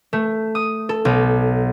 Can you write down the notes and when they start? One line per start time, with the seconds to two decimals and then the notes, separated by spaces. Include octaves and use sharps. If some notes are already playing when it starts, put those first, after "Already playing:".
0.13 A3
0.55 D#6
0.89 A4
1.05 B1